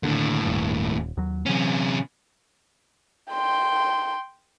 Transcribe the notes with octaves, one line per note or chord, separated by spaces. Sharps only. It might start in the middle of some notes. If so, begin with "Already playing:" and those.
D#2 A2 D3 D4
D#1 G2
D#1
D#2 F#3
C3 E3 F#3 C#4
G5 C6